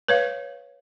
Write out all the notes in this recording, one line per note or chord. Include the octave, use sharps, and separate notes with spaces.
B4 C#5 F5